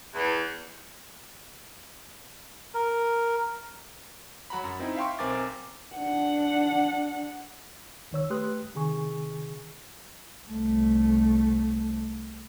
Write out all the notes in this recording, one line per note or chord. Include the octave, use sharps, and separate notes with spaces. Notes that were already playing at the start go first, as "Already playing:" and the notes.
E2
A#4
F#3 F#4 A#5 B5
F#2
C4 D#4 E4
E5 F5 G5 C6 C#6
B1 C4 A#4 G#5 D6 A6
D4 F#5
C2 D#3 C#5 E6
A3 G4 B4 C6 D#6 F#6
C3 D#3 G#4 G#5 C#6
C2 A3